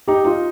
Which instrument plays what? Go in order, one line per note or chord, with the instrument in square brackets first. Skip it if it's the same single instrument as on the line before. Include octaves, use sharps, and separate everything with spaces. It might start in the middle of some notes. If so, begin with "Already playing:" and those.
[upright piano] D#4 [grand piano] G4
[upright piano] D#4 [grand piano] F4